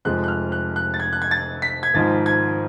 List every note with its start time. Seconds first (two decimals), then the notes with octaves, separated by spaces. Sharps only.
0.05 F1 F2 F3 G#3 F#6
0.24 F#6
0.28 F6
0.52 F#6
0.76 F#6
0.94 A6
1.00 G#6
1.13 F#6
1.22 G#6
1.31 A6
1.62 B6
1.83 G#6
1.94 G#1 G#2 F3 A6
2.26 G#6